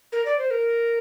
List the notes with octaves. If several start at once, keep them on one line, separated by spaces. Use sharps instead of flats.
A#4
D5
C5
A#4